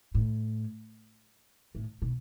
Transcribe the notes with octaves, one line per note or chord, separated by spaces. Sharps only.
A2
A2
B2